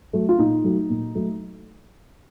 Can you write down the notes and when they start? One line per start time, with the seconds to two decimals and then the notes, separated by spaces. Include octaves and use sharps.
0.13 F#3 A3
0.29 F4
0.38 A#2 D#4
0.64 F#3 A3
0.89 A#2
1.15 F#3 A3